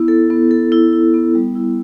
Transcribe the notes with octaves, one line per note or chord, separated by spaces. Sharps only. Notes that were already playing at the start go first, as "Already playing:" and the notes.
Already playing: B3 E4
A4
B3
A4
E4
E4
B3
G3
E4